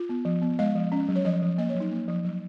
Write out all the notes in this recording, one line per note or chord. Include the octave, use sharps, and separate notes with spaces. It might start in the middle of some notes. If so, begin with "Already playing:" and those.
Already playing: F4
B3
F3
B3
G#3 D#5
F3
C#4
F#3
C#5
F3 D#5
F3
A#3 D#5
C#5
F#3
D#4
A#3
F3
F#3